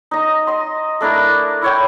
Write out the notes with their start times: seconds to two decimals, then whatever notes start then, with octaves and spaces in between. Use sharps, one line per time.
0.11 D#4 D#5
0.47 D#5 C6
1.01 A3 D4 E4 A#4
1.62 E4 C#5 G5